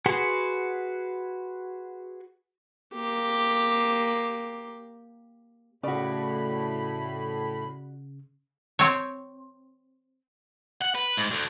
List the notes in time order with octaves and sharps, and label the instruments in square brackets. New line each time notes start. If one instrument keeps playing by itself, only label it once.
[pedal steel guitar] F#4 G#4 B4 F#5 C6
[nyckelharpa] A#3 G4
[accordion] A2 B5 [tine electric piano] C#3 [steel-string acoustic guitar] F#4 D5
[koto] C4 C#5
[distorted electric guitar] F#5
B4
G#2
D2